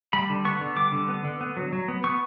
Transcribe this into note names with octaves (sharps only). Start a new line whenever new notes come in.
G3 B5
D3
B3 C#6
D3
G3 D6
D3
B3
D3
B3
F#3
F#3
B3
B3 C#6